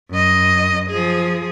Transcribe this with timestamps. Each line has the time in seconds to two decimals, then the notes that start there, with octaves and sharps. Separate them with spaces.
0.11 F#2 D#5
0.90 F3 G#4